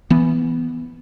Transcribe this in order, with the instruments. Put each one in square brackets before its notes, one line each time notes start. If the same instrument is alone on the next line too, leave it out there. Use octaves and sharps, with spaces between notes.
[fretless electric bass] E3 B3